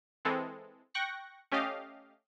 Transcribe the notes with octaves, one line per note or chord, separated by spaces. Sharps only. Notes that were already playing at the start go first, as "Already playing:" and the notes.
E3 G#3 C4 A4
G5 C#6 F#6 A#6 C#7
A3 C#4 G4 D#5 F5